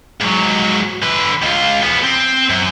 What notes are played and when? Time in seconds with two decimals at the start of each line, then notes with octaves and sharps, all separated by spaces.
0.21 G#2 F#3
1.03 D3 B4
1.42 C#2 F4
1.83 F3 B3
2.03 C4
2.50 F#2